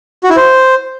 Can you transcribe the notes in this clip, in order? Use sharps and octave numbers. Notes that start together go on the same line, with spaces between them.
F#4
E4
C5